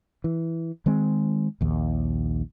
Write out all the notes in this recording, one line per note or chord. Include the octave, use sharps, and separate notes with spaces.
E3
D#3 G#3 C4
A#1 D#2